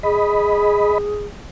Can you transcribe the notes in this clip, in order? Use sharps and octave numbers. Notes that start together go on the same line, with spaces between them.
G#4 D#5 B5